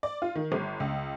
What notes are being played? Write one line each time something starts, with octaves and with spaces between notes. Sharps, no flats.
D5
F4
D#3
G1
C#2